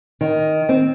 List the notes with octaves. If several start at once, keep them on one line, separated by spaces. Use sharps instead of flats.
D#3
C4